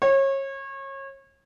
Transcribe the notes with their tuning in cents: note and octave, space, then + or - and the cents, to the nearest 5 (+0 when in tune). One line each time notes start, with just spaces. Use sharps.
C#5 -30